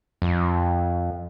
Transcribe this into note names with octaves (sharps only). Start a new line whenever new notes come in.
F2